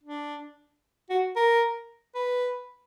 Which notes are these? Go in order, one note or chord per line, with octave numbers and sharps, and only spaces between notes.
D4
F#4
A#4
B4